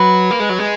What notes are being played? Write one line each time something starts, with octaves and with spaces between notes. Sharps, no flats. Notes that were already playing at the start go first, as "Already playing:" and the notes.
Already playing: F#3 B4
A#3
G#3
F#3
G#3